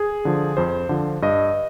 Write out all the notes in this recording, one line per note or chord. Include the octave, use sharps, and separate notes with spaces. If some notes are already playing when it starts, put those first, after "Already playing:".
Already playing: G#4
D3 F3
F2 C5
D3 F3
G2 D#5